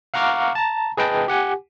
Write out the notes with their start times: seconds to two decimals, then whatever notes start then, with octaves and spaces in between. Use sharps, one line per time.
0.14 F5 F#5 A#5 C#6 D6 F6
0.55 A5 A#5
0.97 G#4 B4 D#5 G5 A5
1.28 G4 F#5 G#5